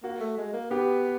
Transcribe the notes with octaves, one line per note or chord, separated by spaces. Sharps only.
A#3 F#4
A3
G#3
A#3
B3 G4